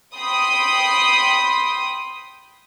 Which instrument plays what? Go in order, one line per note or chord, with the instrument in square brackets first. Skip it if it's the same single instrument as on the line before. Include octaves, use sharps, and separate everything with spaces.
[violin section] G5 B5 C6 D#6